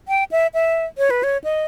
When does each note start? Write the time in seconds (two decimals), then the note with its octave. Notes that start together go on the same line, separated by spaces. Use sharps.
0.08 G5
0.31 E5
0.54 E5
0.98 C#5
1.10 B4
1.23 C#5
1.44 D#5